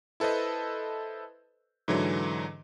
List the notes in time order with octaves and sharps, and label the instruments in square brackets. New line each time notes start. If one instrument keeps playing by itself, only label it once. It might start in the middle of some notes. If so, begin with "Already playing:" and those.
[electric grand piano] E4 A4 B4 C5 D#5
G#2 D3 E3 F#3